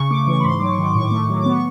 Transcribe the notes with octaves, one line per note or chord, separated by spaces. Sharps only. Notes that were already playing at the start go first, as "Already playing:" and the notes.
Already playing: C#3 C#6
A3 D6
E3 C#6
B5
G#2 C6
F#3 D6
C#6
D#3
D6
A2 C#6
D6
A3 C#6
F#3
D6
B3
C#6